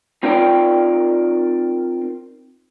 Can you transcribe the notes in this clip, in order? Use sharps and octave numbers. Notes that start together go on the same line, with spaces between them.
C4 D#4 F4 A#4 D5 G5